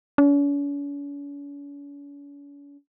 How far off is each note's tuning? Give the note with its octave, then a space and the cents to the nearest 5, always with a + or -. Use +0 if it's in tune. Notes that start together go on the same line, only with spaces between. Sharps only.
C#4 +45